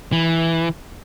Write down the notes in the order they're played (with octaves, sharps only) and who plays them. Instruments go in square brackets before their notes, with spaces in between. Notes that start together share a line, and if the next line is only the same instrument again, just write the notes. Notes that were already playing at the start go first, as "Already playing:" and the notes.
[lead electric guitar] E3